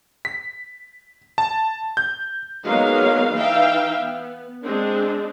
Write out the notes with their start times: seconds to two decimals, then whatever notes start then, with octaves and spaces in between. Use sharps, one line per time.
0.25 B6
1.38 A5
1.97 G6
2.66 F#3 G#3 A#3 B3 D#4 F5
3.36 E3 D#4 E5 F5 G5
3.97 B3
4.65 G#3 C4 D4